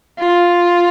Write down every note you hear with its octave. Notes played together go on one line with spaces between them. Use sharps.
F4